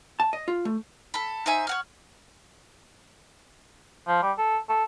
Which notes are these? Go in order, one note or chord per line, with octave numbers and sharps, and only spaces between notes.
A5
D#5
F4
A3
A4 B5
D#4 C5 E5 G#5
C#5 F#5 F6
F3
G3
A4
A4